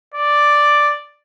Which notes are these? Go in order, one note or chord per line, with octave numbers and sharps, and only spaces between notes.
D5